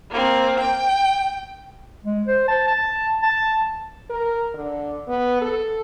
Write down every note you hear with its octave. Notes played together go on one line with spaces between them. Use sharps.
A#3 C4
G5
G#3
C5
A5
A5
A5
A#4
D3
B3
A4